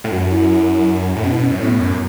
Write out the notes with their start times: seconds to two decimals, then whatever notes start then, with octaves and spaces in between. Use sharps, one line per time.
0.04 A2
0.11 F#2 F#4
0.30 E4
1.16 A2
1.24 B2 C#4
1.31 E4
1.39 C#4
1.52 F#2
1.60 A2 B3
1.79 F#2